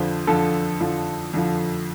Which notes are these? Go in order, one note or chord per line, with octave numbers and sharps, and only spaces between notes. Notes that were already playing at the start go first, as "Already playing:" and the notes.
Already playing: F2 D3 F3 C5
F2 D3 F3 A4
F2 D3 F3
F2 D3 F3